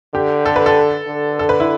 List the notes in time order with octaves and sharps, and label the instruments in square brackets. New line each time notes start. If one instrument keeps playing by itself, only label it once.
[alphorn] D3 [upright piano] G4
[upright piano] A4
B4
A4
[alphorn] D3
[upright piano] A4
B4
E4